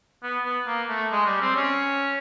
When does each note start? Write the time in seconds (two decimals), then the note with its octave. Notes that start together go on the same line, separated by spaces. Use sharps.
0.23 B3
0.45 B3
0.66 A#3
0.89 A3
1.11 G#3
1.25 G3
1.41 C4
1.55 C#4